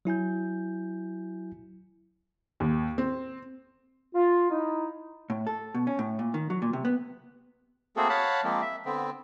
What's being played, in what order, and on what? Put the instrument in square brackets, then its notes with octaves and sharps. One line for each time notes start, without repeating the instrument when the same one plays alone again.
[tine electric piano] F#3 E4 G#5 G6
[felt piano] D#2
C4
[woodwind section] F4
D#4 E4
[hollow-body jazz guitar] A2
A4
B2
C#4
A2
A#2
D#3
F#3
A#2
C3
B3
[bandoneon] A3 A#3 C4 F#4 G#4 A4
C#5 F5 F#5 A5 B5
F3 G#3 A#3 C4
E5
D3 B3 C4